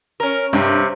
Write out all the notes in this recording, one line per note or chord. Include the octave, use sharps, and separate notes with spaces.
C#4 A#4
G2 C3